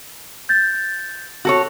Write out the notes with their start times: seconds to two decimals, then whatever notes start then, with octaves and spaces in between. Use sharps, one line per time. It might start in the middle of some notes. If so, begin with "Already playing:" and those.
0.49 G6 A6
1.45 F#4 A4 C#5